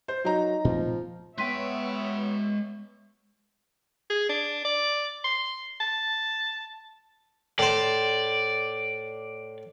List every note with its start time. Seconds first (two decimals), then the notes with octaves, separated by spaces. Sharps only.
0.08 C5
0.25 F#3 D#4 A#5
0.65 A#2 F3 A3 C4
1.38 G#3 B3 C#5 E5 G5 C6 B6 D#7
4.10 G#4
4.29 D4
4.65 D5
5.24 C6
5.80 A5
7.59 A2 C5 D5